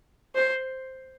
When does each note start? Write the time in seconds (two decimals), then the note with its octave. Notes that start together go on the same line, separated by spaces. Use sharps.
0.35 C5